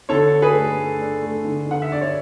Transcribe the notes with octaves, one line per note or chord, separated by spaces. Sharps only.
D3 A4 C#5
D4
G#4 B4
A3
A3
D4
A3
D3
D3 F#5
E5
D4 D5
C#5